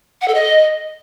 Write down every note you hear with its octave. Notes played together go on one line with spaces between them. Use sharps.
F#5
A4
D#5